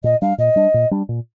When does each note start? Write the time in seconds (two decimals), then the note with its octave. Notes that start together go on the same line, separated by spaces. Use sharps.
0.04 A#2 D#5
0.21 G3 D4 F5
0.38 A#2 D#5
0.56 G3 D4
0.74 A#2
0.91 G3 D4
1.09 A#2